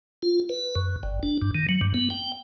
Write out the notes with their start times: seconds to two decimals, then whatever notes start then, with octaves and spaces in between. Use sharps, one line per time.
0.23 F4
0.49 B4
0.75 F#2
1.03 G1
1.23 D4
1.42 G2
1.55 D#3
1.69 F#3
1.81 G2
1.94 B3
2.10 G5